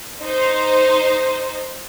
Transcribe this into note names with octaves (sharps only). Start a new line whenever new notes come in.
D#4 C5